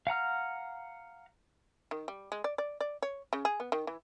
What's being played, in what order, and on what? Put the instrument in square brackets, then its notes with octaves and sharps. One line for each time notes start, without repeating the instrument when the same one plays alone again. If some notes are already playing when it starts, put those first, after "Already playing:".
[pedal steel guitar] F5 F#5 A#5 F6
[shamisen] D#3
G3
G#3
D5
D5
D5
C#5
C#3
G#4
B3
D#3
E3